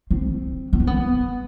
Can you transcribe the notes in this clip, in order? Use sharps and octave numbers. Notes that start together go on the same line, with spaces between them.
C4
B3
C4
B3